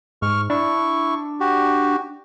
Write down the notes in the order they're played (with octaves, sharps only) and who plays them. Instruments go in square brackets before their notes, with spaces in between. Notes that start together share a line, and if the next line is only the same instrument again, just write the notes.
[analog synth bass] G#2 [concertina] C#6 F6
[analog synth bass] D4 [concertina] E4 C#6
[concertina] F#4 G4